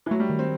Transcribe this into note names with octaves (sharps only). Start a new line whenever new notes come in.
E3
F#3 A3
G3
D#3
C4